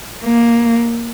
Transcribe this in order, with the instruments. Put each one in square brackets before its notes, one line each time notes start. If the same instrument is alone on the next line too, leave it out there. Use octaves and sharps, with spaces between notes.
[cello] A#3